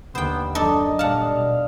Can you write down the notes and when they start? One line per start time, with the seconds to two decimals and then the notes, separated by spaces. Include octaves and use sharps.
0.15 D#2 D3 B3 C5 G5
0.55 F#2 D#3 D4 D#4 A4 D#5
0.99 A#2 G3 D4 F5 F#5 A5
1.34 B2